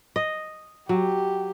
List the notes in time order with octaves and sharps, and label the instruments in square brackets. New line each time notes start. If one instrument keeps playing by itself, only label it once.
[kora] D#5
[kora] F#3 [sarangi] G4